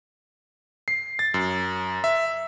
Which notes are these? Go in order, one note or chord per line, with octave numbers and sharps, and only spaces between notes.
C7
A6
F#2
E5